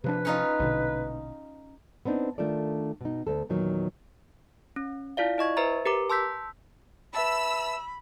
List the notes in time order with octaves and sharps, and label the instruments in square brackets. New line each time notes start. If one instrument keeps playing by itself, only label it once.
[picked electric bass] C3 F3 D4 [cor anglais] B4
[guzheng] C#4 D#4 F4
[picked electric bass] A#1 B2 D3
[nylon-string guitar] B3 C4 D4 D#4
D#3 A3 D4 F4 A4 D5
B2 D#4
D2 A4
E2 A#2 D#3 F#3 A#3
[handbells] C#4
E4 F4 D5 F5
E4 D#5 C#6 G#6
B4 C5 E5 A#5 A6
G4 A#4 B4 A#5 D6
A5 C6 E6 G6 B6
[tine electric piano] B4 E5 A5 [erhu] B5 [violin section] E6